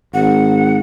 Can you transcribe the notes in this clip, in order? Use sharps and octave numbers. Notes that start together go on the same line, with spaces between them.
G#1 F#5